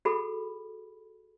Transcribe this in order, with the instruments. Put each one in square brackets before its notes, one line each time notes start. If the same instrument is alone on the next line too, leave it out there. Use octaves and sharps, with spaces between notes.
[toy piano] F#4 G#4 A4 B5